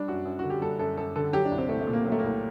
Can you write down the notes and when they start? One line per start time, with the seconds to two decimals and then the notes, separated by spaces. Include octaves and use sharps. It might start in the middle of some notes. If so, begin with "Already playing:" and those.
Already playing: G3 D4
0.08 F#2 F#4
0.25 F#2
0.39 D3 F#4
0.50 G4
0.62 G3 A4
0.79 F#2 A4
0.97 F#2 A4
1.16 D3 A4
1.33 F#3 G4
1.45 D4
1.52 C2
1.58 C4
1.69 C2 A3
1.81 A3
1.87 A#2
1.93 A#3
2.05 F#3 A#3
2.12 A3
2.19 C2 A#3